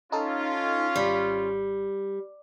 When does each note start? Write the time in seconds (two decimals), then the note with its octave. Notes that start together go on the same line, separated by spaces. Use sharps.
0.12 C#4 D#4 F4 A4 A5
0.96 G#1 G3